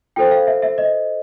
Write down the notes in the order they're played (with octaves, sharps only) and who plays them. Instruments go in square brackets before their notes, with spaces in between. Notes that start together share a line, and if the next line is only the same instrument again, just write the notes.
[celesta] F4 A4 C5 G5
F5
E5
E5
D#5